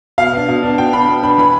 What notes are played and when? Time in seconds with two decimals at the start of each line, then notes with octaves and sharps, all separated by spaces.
0.18 B2 F5
0.32 B3 D4
0.48 B2
0.63 B3 D4
0.78 B2 G5
0.93 B3 D4 B5
1.08 B2
1.23 B3 D4 B5
1.38 E3 B5